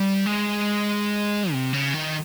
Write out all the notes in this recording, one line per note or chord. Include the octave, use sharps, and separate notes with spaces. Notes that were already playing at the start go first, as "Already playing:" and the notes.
Already playing: G3
G#3
C3
C#3
D#3